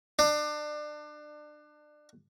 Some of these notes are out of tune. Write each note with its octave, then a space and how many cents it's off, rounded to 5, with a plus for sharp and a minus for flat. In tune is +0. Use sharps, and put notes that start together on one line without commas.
D4 +30